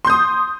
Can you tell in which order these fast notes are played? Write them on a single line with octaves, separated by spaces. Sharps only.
C6 G6 D#6